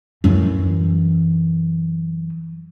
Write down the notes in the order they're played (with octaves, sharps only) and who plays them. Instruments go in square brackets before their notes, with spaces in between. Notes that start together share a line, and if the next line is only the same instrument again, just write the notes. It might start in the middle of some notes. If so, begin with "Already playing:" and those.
[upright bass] F#2 E3